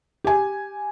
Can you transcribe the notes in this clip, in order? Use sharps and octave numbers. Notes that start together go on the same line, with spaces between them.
G4 G#5